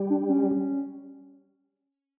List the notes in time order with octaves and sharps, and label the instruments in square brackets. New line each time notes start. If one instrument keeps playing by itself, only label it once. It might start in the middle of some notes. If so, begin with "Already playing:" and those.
Already playing: [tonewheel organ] G3
[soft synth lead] D4
C#4